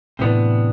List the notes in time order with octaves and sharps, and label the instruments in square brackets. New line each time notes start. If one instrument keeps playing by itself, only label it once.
[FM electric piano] A2 [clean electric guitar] C3 E3 B3 D4